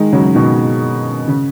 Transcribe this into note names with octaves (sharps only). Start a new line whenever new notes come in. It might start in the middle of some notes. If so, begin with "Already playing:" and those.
Already playing: D#3 G#3
C#3 F#3
B2 D#3
C#3